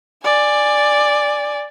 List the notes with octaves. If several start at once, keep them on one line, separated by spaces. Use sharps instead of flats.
D5 G#5